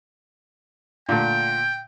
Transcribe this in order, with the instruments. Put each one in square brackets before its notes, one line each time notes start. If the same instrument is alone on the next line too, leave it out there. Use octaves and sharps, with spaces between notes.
[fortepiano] A#2 D3 A3 [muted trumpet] G5